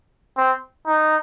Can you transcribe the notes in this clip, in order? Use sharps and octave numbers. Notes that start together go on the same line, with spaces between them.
C4
D#4